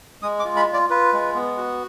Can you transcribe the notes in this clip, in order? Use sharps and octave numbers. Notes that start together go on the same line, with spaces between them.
G#3 D#6
D6
F4
B5
F4
D5
F4 B4
G#3
B3
F#4